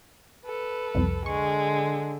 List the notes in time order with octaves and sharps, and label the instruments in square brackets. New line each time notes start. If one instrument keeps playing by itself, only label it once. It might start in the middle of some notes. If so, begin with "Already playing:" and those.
[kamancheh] A4 B4
[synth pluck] C2 F2
[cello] D3 [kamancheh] G#3 [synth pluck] C#6